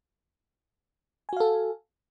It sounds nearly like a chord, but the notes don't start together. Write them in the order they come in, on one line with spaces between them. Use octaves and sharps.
G#5 F#4 F5 A4